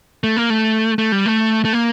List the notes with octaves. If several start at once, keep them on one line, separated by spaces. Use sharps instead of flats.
A3
A#3
A3
A3
G3
A3
A3
A#3